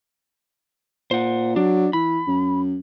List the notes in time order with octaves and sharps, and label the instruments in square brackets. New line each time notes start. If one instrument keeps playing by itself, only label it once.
[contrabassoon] A#2 [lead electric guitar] C5 F#5
[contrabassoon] F#3 [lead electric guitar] D4
[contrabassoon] E3 [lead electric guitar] B5
[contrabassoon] F#2